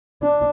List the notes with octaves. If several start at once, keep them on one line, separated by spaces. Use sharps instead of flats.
D4